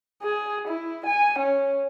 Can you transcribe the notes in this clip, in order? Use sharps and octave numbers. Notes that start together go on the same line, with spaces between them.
G#4
E4
G#5
C#4